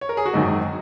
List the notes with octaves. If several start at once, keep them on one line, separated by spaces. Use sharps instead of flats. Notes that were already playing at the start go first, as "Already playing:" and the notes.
C#5
A#4
G#4
F#4
G#1 F#2 D#3 D#4